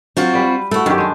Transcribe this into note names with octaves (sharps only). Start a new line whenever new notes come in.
F#3 C4 F4 F#4
G3 B4 D5
A3 E4 F#4 A4
F#2 D#3 C#4 G4
G#3 D4